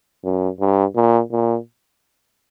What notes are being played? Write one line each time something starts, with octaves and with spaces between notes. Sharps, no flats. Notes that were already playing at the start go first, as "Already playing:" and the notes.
F#2
G2
A#2
A#2